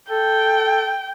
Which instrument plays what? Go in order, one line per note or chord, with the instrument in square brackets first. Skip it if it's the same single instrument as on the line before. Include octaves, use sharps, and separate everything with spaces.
[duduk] A4 [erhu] G5